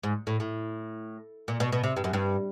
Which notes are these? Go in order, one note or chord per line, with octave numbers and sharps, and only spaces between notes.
G#2
A2
A2
A#2
B2
B2
C3
G2
F#2
G2